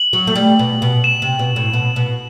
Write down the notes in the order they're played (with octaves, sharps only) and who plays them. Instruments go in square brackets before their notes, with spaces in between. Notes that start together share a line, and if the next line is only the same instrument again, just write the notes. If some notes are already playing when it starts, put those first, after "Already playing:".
Already playing: [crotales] F#7
[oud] F#3
A3
G3
B2
B2
[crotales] E7
[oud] C3
B2
A2
B2
B2